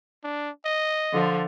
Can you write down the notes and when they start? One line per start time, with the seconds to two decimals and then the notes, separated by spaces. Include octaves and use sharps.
0.24 D4
0.65 D#5
1.13 D3 F3